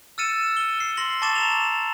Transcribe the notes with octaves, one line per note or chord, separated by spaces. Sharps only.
E6 F6 A6 C#7 D#7 E7
G7
C7
C6 A#6 F#7
A5 C#6 D6 A6 E7
A#5 E7 F7